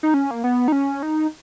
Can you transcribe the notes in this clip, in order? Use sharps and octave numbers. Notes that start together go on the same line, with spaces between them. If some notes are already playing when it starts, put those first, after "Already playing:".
D#4
C#4
A#3
B3
D#4
C#4
D#4